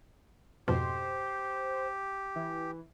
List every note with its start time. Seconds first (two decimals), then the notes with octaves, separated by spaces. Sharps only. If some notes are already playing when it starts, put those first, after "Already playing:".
0.68 F2 G#2 B2 G4 C5
2.36 E3